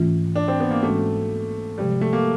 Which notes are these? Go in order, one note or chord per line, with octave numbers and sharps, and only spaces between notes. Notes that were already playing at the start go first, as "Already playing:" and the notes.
Already playing: G#2 E3 A3 C#4 F4
D4
C4
B3
A#3
G#2 E3 G#3 A3 C#4 F#4
C3 F3 G3 G#3
A3
A#3